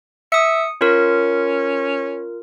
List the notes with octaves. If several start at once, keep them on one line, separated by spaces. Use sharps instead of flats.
E5 D#6 C#7
C#4 F4 A#4